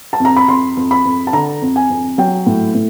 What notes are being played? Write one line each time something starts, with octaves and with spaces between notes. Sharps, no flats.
A5
F2
A#5
B5
F2 C6
F2
B5
F2
A5
D3 A#5
F2
G#5
F2
F#3 G5
A2
A2